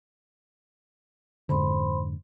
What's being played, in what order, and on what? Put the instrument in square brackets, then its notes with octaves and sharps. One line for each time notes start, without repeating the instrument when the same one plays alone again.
[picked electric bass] F2 G#2 D3 [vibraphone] C5 B5 C6